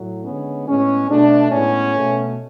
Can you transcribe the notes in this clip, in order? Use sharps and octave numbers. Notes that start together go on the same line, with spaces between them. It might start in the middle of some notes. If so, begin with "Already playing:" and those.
Already playing: A2 F#3 A3
D3 G#3 B3 C#4
A2 G#3 B3 C#4
B2 A3 D4
A2 G#3 B3 C#4
B2 A3